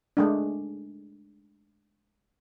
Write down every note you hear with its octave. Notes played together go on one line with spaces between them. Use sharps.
G#3 A3 D4